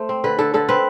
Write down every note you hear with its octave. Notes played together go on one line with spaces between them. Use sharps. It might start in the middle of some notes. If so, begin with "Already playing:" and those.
Already playing: A3 C5
C4
D3 B4
D3 A4
D3 A4
C4 B4